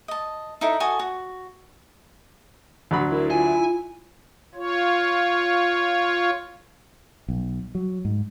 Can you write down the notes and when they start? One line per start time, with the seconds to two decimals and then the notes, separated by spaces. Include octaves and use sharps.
0.08 D#5 A5
0.61 D#4 E4 A4
0.80 F#4 A4 G#5 D#6
0.99 F#4
2.91 D2 F#3 B5
3.11 E4 A#4
3.31 F4 G#5
4.55 F4 C#5
7.28 B1
7.75 F#3
8.05 G#2